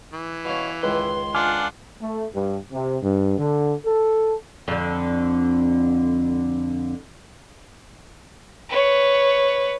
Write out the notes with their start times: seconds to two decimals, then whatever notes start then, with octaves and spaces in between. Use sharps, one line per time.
0.13 E3
0.45 B2 C#4 F5
0.83 C#2 D#3 B4 C6
1.35 D4 F4 F#5 G#5 D6 F6
2.01 A3
2.33 G2
2.72 C3
3.02 G2
3.38 D3
3.84 A4
4.68 F2 D3
8.69 B4 C#5